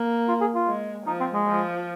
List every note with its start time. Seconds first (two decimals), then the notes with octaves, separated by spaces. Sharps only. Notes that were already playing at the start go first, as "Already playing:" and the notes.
Already playing: A#3
0.29 F4
0.41 G#4
0.55 F4
0.67 G#3
1.07 F3 D#4
1.20 C4
1.33 G#3
1.46 F3